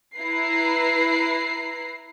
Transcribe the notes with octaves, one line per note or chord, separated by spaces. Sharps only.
E4 B4 A#5 C7